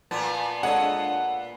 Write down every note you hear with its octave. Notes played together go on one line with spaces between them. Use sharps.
A#2 B3 A5
G#3 D4 A4 C#5 D#5 F#5